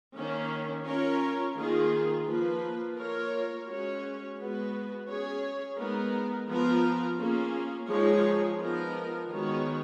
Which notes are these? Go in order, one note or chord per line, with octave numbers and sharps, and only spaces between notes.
D#3 A#3 C#4
C#4 F4 A#4 C#5
D#3 A#3 F4 G#4
F3 A#3 F4 B4
A#3 F4 A#4 C#5
G#3 C#4 F#4 C#5
G#3 B3 F#4 B4
C#4 G#4 C#5
G#3 B3 D#4 A#4
F3 B3 F4 A#4
A#3 C#4 F4 G#4
F3 G#3 D#4 G#4 C#5
F3 B3 D#4 A#4
D#3 G#3 B3 F#4 C#5